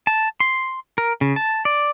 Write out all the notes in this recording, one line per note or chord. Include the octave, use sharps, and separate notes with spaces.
A5
C6
A#4
C#3
A5
D5